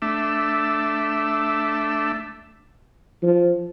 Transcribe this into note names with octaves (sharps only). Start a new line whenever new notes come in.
A3 D4 E5
F3